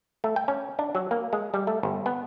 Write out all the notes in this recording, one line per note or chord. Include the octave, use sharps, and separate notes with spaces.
A3
G5
C#4
D4
F#3
A#3
G#3
G3
A3
G1
B3